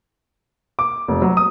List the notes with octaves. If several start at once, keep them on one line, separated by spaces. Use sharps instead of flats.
D6
F1
F#3
D#6